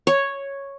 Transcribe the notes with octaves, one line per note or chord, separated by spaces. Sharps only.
C#5